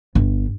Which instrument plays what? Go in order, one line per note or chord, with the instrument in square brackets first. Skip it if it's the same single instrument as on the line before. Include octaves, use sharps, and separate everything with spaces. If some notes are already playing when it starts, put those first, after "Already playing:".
[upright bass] G1